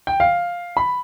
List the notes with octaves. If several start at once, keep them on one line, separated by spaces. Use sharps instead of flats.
G5
F5
B5